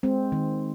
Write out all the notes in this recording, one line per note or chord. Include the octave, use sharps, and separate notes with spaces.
G#3 C4
D#3